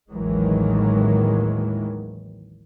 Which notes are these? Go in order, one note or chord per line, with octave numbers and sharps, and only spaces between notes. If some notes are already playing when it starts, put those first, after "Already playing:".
A1 D#2 D#3 E3 F#3 G#3